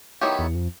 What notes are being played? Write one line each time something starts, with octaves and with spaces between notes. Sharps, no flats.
D#3 F#3 B3 E4 G4
E2
F2